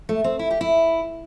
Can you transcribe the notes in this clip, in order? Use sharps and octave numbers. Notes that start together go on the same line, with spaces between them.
A3
C4
E4
G4
E4